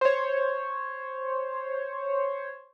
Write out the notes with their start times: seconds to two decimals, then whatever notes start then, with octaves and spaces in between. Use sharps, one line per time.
0.01 C5 C#5